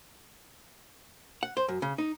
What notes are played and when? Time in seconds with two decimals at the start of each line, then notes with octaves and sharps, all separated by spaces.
1.43 F#5
1.57 C5
1.68 F#2
1.82 C#3
1.98 D#4